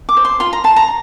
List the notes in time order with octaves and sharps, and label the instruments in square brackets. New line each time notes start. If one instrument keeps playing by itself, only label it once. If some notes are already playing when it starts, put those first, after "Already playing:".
[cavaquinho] D6
C5
C6
F4 C6
A#5
C5 A5
A#5